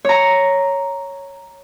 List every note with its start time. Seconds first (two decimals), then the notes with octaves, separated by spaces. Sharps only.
0.05 C#5 A#5